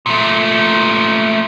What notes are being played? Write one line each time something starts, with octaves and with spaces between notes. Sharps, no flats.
A#2 A3